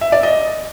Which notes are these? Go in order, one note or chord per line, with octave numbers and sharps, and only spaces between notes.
E5
D5
D#5